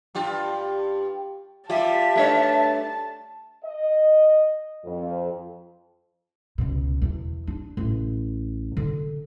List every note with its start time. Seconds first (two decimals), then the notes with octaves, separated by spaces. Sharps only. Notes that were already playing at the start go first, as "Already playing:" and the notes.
0.15 G2 F4 G4
1.70 G3 F4 G4 E5 A5
2.16 G2 A3 D4 C#5
3.64 D#5
4.85 F2
6.58 C#2 B2
7.02 E2
7.47 D4
7.77 A1
8.77 D3